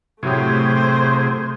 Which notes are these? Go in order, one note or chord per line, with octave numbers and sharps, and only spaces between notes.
A2 C3 F#3 A3 G4 G#4 C5